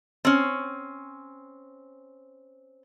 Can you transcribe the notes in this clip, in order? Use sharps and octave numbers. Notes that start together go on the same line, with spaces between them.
C4 C#4